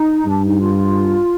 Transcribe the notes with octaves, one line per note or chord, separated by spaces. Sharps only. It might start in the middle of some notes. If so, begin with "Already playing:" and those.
Already playing: D#4
G2 D4
D#4
F4